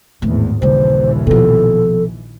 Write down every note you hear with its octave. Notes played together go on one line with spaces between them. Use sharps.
G#1 E2 A2 E3
A#1 D#2 C#3 E3 G3 C5
B2 F3 A4